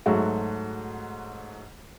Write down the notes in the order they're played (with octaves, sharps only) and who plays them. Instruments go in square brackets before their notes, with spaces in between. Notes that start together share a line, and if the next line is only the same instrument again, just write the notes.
[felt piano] G#2 F#3 A3 F#4